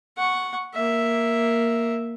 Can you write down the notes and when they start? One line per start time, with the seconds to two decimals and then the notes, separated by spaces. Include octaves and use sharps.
0.17 F#5 C#6
0.74 A#3 E5